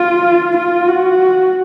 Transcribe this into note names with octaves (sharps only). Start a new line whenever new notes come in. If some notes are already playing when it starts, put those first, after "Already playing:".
Already playing: F4
F4
F#4